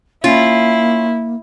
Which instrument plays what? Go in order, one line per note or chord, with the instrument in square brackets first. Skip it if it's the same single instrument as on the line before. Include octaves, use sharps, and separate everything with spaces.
[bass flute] A#3 [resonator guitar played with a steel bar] C#4 F4 [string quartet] E4